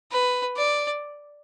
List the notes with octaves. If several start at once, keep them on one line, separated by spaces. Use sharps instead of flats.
B4
D5